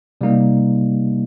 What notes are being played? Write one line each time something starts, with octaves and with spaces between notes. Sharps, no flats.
C3 G3 A#3 D#4